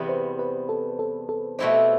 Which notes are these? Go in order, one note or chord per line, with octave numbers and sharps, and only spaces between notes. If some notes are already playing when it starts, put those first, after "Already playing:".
Already playing: E2 C3 G3 B3 B4
C5
B4
A4
A4
A4
B2 A3 C4 E4 G4 C5